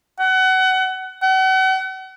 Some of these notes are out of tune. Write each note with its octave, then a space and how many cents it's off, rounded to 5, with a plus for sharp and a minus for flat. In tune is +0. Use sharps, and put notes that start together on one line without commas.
F#5 +25
F#5 +40